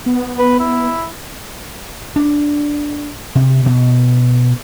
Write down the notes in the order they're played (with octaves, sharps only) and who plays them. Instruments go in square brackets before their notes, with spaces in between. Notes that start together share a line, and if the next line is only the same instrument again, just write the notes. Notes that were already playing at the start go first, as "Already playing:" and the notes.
[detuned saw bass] B3
[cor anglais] B4
E4
[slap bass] D4
C3
B2